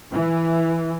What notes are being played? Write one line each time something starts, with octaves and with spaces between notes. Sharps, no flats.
E3